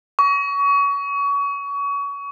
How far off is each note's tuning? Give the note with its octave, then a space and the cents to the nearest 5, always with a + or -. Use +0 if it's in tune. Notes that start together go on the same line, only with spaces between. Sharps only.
C#6 +30